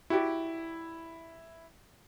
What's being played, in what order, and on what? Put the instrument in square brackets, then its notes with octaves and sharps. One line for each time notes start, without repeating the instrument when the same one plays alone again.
[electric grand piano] E4 [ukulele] F#4 G4 D5